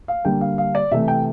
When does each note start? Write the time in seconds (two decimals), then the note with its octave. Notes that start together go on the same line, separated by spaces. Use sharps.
0.08 F5
0.24 D3 G3 A#3 G5
0.41 F5
0.58 F5
0.75 D5
0.91 C3 E3 A3 E5
1.08 G5